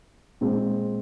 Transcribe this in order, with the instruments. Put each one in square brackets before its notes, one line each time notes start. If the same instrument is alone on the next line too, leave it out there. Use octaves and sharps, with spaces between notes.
[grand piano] A#2 G#3 C4